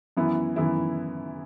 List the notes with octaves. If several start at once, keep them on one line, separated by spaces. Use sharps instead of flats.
F#2 E3 B3 E4
F#2 E3 B3 E4